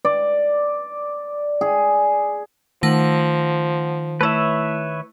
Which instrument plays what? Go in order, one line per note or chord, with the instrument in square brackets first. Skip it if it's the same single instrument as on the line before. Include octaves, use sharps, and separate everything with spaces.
[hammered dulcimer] D5
G#4
[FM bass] D#3 [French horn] F3 [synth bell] A3 F#5 A#6
[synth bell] A3 E4 [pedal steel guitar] B4 C#5 E5